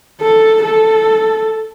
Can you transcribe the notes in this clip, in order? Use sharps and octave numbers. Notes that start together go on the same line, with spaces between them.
A4
A4